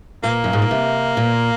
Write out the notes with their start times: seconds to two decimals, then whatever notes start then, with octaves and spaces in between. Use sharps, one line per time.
0.23 A#2 A#3
0.44 F#2
0.53 G#2
0.62 A#2
0.71 C3
1.17 A#2